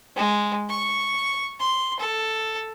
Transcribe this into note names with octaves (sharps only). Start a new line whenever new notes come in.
G#3
C#6
C6
A4